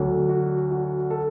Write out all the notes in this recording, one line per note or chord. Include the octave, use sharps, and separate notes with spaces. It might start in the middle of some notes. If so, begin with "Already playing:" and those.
Already playing: D2 D3 F#3
F#4
F#4
A4